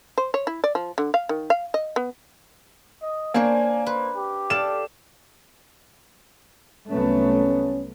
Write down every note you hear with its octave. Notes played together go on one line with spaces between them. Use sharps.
C5
C#5
E4
D5
F3
D3
F5
D#3
F5
D#5
B3
D#5
A#3 D4 C5 C#5 G#5
B4 C5
G4
A4 D5 F5 E7
C2 F#3 A3 B3 C#4